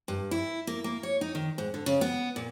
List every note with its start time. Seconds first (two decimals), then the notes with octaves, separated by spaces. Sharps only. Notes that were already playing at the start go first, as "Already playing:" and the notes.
0.08 G2
0.31 E4
0.67 A#3
0.84 A#3
1.03 C#5
1.21 D#4
1.35 D#3
1.58 G#2
1.74 D3
1.86 C#3
2.01 B3
2.36 A#2